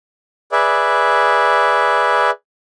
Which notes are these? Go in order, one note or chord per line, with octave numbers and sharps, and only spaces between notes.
G#4 B4 D5 E5